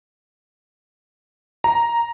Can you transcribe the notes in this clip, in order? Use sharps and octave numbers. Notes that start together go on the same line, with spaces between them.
A#5